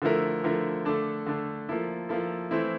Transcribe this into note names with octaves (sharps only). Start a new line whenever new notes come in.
D3 F3 A3 E4 A#4
D3 F3 A3 E4 A#4
D3 A3 D4 A4
D3 A3 D4 A4
F3 A#3 E4 A4
F3 A#3 E4 A4
E3 A3 C4 E4